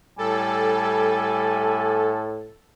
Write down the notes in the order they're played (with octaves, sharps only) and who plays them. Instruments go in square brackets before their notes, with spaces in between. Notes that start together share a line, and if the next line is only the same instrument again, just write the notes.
[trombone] A2 [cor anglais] G3 [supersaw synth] A4 [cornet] G#5